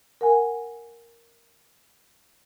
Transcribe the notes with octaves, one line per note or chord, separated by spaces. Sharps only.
A#4 F#5 G#5